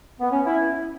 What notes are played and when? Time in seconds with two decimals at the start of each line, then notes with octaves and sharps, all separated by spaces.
0.20 B3
0.31 C#4
0.46 E4